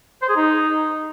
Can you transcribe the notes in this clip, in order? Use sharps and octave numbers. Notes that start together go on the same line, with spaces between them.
C5
G#4
D#4